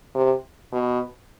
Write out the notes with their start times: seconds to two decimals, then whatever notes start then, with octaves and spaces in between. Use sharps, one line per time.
0.15 C3
0.73 B2